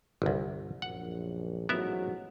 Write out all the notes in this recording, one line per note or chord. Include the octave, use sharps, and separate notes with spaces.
G1 C2
A#1 F#2 F#5
A1 G#2 F#3 B3 A#4 E5